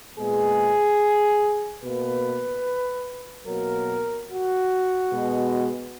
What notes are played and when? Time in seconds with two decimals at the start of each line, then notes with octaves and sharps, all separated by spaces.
0.17 A#2 G#3 B3 G#4
1.82 B2 A#3 B4
3.46 B2 F#3 A#3 A#4
4.28 F#4
5.10 B2 G#3 B3